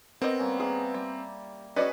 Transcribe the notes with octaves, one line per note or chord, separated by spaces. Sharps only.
B3 C4 A#4 D#5
G3 A#3 C#4
G#4 A#4 E5 D6
G3 G5
C#4 F#4 G#4 B4 D5 D#5 G#5